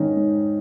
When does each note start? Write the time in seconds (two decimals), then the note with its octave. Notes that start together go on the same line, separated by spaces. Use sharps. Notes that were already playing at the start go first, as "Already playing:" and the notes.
Already playing: G#2 D#3 C#4 D#4
0.17 G#2